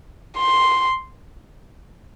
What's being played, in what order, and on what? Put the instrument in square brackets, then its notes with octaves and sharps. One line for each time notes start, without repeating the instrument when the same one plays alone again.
[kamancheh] C6